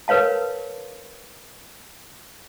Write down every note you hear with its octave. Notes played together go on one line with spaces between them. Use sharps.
A#4 B4 C#5 F5 A5